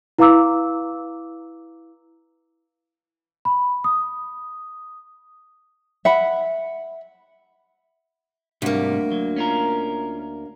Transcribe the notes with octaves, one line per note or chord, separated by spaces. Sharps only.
E4 B4 F5 A#5 D6 E6
B5
D#6
E5 F#5 B5
D2 G#2 C3 G3 A#3
F#3
C#4 F4 A#4